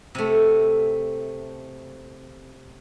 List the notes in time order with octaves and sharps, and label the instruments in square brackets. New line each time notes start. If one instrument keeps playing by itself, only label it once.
[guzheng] C3 A3